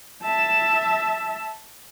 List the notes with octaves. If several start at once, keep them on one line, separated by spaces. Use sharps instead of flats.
E5 A5